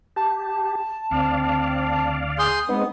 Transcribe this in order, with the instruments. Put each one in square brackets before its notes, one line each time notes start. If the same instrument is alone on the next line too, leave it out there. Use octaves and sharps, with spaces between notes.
[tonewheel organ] G4 [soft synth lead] A5
[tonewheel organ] D2 D5 F5 [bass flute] C4
[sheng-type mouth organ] G#4 C6 G6 [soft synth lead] D#6
[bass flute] G#3 [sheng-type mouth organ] B3 [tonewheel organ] C4 D#4